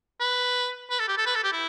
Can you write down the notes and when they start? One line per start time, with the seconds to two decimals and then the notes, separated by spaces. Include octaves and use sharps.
0.20 B4
0.90 B4
0.99 A4
1.08 G4
1.18 A4
1.27 B4
1.35 A4
1.43 G4
1.52 E4